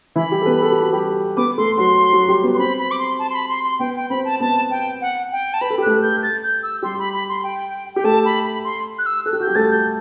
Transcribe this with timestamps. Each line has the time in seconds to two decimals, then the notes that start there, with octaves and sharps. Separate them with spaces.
0.16 E3 E4 B5
0.31 G3 G4
0.42 A4
0.46 B3 B4
0.62 A4
0.72 G4
0.82 F#4
0.93 G3 G4
1.37 B3 B4 D6
1.57 A3 A4 C6
1.77 F#3 F#4 C6
2.13 F#3 F#4
2.28 G3 G4
2.44 B3 B4
2.55 C6
2.59 C4 C5 B5
2.79 B5
2.91 D6
2.99 C6
3.19 A5
3.30 C6
3.35 B5
3.49 C6
3.64 C6
3.79 B3 B4 G5
3.96 G5
4.10 C4 C5 B5
4.25 A5
4.40 B3 B4 A5
4.70 G5
5.01 F#5
5.32 G5
5.54 A5
5.61 B4 B5
5.70 A4
5.78 G4
5.82 A3 A4 F#6
6.02 G6
6.23 A6
6.43 G6
6.63 E6
6.82 G3 G4 C6
6.99 B5
7.14 B5
7.29 C6
7.43 G5
7.94 G4 G5
8.04 A3 A4 A5
8.25 B5
8.44 B5
8.64 C6
8.99 F#6
9.06 E6
9.26 A4 F#6
9.33 G4
9.40 F#4 G6
9.47 G3 G4
9.55 A3 A4 A6
9.71 G6